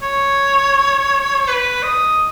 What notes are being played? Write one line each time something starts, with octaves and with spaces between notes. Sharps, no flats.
C#5
B4
D#5